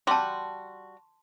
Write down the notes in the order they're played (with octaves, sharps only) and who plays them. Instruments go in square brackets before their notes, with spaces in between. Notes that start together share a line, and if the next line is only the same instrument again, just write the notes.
[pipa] G3 F#4 [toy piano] A5 C6